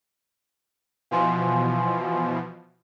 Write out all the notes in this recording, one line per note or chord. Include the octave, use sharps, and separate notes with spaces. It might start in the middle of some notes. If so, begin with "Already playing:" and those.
B2 E3 F3 F5 G#5 C6